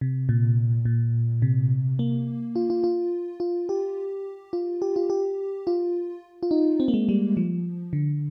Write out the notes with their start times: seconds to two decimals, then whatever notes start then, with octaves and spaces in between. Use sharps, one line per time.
0.01 C3
0.29 A#2
0.85 A#2
1.42 C3
1.99 A#3
2.56 F4
2.70 F4
2.84 F4
3.40 F4
3.69 G4
4.53 F4
4.82 G4
4.96 F4
5.10 G4
5.67 F4
6.43 F4
6.51 D#4
6.80 C4
6.88 A#3
6.94 G#3
7.09 G3
7.37 F3
7.93 D3